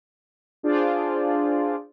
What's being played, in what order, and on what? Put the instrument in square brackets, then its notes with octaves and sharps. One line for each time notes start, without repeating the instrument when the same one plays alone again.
[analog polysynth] D4 F4 G#4 C5 D5